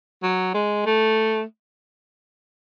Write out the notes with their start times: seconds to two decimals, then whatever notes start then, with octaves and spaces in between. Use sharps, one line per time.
0.23 F#3
0.54 G#3
0.86 A3